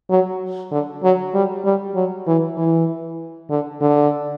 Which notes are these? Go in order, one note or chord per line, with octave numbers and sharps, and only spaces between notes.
F#3
D3
F#3
G3
G3
F#3
E3
E3
D3
D3